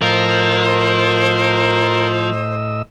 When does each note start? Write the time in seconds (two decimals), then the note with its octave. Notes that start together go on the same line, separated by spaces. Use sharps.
0.02 A2 F3 A#4 C5 D#5 E6